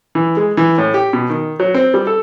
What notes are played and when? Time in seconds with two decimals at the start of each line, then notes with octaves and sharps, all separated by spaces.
0.15 E3
0.37 G#3
0.57 E3
0.78 A2
0.94 G4
1.13 B2
1.30 D#3
1.60 F#3
1.74 C4
1.94 G3
2.07 A4